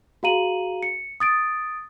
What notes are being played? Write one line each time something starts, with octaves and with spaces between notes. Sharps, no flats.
F#4 G#4 F5 A#5 D#7 F#7
C#7
D#6 A6 D7